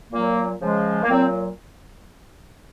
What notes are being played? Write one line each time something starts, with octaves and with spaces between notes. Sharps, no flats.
A#2 F#3 A#3
C#3 F3 G#3
A#3
A#2 F#3 C4